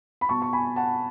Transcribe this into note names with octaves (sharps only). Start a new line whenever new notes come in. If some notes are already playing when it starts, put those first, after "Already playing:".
B5
B2 A5 C#6
C#6
G#5 B5
F#5 A5